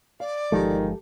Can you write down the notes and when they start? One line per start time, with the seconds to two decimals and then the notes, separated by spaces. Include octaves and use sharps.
0.20 D5 F5
0.52 G1 D#3 F3 G#3 G4 A4